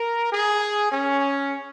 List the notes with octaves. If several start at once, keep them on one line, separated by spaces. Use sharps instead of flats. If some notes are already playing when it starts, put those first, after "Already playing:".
Already playing: A#4
G#4
C#4